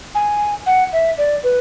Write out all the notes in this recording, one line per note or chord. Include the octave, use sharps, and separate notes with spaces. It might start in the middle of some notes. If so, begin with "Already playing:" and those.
G#5
F#5
E5
D5
B4